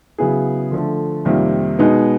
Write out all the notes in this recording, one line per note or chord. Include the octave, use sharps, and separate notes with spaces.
C#3 F#3 B3 E4 G#4
D3 F3 A3
F2 C3 D#3 G3 A#3
B2 G#3 B3 D#4